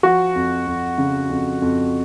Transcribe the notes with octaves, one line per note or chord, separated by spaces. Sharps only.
F3 F#4
F2
F2
C#3
F2
F2